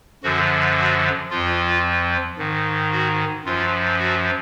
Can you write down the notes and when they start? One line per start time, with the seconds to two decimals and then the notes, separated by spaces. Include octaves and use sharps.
0.23 F#2 D3 F3 F#4
0.78 F#4
1.31 F2 F3 F4
2.38 G#2 D#3
2.92 F#4
3.45 F#2 F3 F4
3.99 F#4